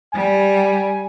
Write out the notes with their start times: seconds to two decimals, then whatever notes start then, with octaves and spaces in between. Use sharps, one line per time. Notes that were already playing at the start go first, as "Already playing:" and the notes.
0.13 G3 G#5